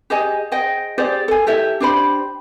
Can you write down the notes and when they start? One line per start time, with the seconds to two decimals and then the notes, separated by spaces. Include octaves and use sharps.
0.10 G4 G#4 D#5 G#5
0.52 G#4 C5 D#5 G5
0.98 G4 G#4 C5 D5
1.28 A4 G#5
1.47 E4 G4 A4 E5
1.80 D4 G4 C5 B5